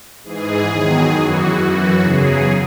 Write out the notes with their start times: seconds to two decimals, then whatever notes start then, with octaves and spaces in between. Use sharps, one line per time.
0.24 G#2 E3 G#4
0.68 E2 D#3 F#3
1.13 F#2 E3 F#4
1.56 F#2 E3 F#4
2.01 E2 C#3 F#3 G#4